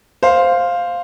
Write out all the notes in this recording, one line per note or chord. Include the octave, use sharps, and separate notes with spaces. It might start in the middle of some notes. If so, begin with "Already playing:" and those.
C5 F5